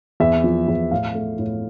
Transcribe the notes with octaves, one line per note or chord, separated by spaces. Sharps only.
E2 E5
F3
E2
A2 F5
A3
A2